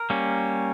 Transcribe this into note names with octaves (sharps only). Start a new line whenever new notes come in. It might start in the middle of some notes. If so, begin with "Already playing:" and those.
Already playing: A#4
G3 A#3 C#4